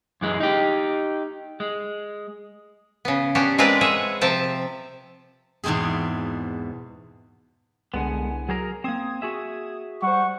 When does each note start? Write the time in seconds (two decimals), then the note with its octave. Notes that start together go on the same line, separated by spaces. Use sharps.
0.21 F#2 E3 G#3
0.40 D#4 G4
1.60 G#3
3.05 C#3 B3
3.35 B3 C#4 D4 F#4 G4
3.58 G#3 C4 F4 A#4 B4 D5
3.81 G#4 B4 C#5 E5 F#5
4.21 C3 F3 G5 A5
5.64 E2 G#2 B2 C4 G#4
7.94 C2 D3 G#3 B3 F#5 G#5
8.49 F#3 G#4 A#4
8.84 A#3 C4 D#6 G#6
9.22 F#4 G#4 E5
10.02 G3 C5 F#5 C#6